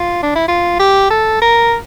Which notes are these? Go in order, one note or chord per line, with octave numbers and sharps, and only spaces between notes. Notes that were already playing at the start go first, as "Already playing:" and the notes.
Already playing: F4
D4
E4
F4
G4
A4
A#4